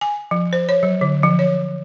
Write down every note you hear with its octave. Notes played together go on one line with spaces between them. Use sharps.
G#5
F3
C5
C#5
F#3
D3
F3
C#5